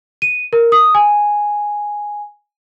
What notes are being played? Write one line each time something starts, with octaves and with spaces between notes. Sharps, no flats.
D#7
A#4
D#6
G#5